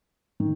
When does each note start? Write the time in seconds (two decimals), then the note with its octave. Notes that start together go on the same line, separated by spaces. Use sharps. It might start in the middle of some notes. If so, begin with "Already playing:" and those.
0.40 D#3